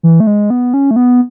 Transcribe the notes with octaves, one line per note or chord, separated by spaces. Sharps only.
E3
A3
G#3
B3
C#4
A3
B3